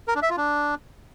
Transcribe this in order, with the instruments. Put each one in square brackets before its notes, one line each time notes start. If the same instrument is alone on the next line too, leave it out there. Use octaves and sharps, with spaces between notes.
[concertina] A#4
D4
E5
F4
D4